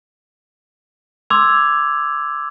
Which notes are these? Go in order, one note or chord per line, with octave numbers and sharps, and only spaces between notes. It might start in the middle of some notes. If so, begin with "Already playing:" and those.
C6 D6 E6 G#6 F7